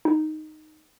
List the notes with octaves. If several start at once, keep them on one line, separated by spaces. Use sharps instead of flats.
D#4